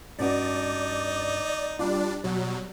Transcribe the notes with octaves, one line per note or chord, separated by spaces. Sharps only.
G2 C#4 D#4 F#4 D5
G3 D4 F4 D5
B2 F#3 G3